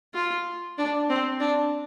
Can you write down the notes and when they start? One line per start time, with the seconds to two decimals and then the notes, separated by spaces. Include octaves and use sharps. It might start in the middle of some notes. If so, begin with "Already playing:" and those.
0.14 F4
0.78 D4
1.09 C4
1.40 D4